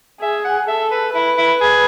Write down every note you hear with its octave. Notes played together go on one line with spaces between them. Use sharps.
G#4 E5
F#5
A4 E5
B4
E4 B4
E4
G#4